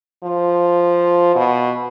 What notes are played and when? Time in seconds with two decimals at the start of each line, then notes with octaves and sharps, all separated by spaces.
0.24 F3
1.36 B2